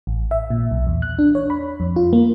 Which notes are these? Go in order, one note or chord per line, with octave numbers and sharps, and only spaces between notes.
A1
E5
A#2
B1
E2
F#6
D4
C#5
B5
F2
F4
A#3